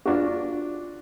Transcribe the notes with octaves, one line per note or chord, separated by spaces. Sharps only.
D4 F4 F#4